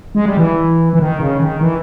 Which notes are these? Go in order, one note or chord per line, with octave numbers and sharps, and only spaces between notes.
G#3
G3
E3
E3
D#3
C#3
D#3
E3